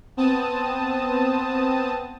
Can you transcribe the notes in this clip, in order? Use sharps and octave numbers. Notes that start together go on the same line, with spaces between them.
B3 C4 A5 D#6